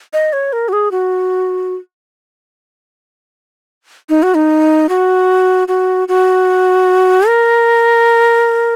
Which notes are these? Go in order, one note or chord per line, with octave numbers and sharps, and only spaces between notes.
D#5
C#5
A#4
F#4
G#4
F#4
D#4
F#4
D#4
F#4
F#4
F#4
A#4